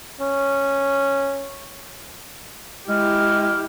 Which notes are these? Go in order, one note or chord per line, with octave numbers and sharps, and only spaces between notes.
C#4
G#3 E4 G4 F6